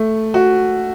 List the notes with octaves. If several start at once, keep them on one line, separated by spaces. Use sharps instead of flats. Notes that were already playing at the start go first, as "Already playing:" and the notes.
Already playing: A3
F#4